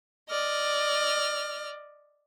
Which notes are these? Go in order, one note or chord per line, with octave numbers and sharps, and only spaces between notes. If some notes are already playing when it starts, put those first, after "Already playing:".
D5 D#5 F6